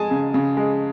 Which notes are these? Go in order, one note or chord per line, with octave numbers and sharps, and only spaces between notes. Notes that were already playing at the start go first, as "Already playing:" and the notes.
Already playing: G#3 G#5 A5
C#3
C#3
G#3